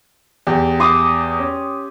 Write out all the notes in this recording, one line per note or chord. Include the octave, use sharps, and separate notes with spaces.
E2 G4
C6 D6 D#6
C#4